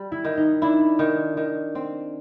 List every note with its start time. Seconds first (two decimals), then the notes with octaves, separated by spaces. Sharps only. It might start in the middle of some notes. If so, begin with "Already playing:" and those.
Already playing: G3
0.12 E4
0.25 D#3
0.37 D#4
0.62 D4 E4
0.99 D#3
1.37 D#3
1.75 C4